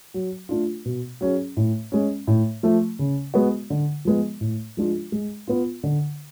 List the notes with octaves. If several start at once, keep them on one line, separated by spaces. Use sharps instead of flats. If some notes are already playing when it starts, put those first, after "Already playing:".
F#3
A3 D4 F4
B2
F#3 C#4 G#4
A2
G#3 C#4
A2
F3 A3
C#3
G#3 B3 F#4
D3
F3 G#3 B3
A2
F3 G#3 D4 F4
G#3
B3 F4
D3